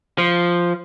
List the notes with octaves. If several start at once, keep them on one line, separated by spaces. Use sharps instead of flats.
F3